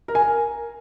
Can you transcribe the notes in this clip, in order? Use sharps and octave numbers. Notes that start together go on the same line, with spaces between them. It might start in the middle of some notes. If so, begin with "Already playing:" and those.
A#4
G#5
A#4